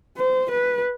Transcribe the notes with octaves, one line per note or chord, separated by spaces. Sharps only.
C5
B4